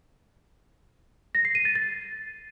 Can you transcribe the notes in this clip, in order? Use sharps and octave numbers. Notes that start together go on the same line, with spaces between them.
A#6
C7
D#7
A6
A6